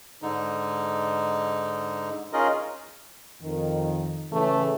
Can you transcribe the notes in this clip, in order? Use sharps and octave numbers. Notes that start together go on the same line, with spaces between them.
G#2 D3 D#4
C#4 D#4 F4 G#4 A#4 D#5
F2 D#3
A2 C#3 E3 A3